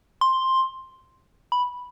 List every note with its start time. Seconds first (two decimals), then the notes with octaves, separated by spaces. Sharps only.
0.21 C6
1.52 B5